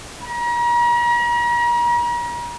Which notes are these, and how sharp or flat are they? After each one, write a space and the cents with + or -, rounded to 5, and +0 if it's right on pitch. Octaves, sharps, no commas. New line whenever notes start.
A#5 +40